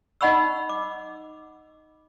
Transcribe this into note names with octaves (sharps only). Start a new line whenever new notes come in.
D#4 D#5 F#5 B5 C#6 E6
D6